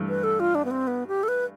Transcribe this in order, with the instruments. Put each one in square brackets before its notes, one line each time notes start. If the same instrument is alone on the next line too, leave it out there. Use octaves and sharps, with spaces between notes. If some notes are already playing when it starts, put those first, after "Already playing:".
Already playing: [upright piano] G2 E3 A3
[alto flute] B4
A4
F4
D4
B3
C4
B3
G4
A4
B4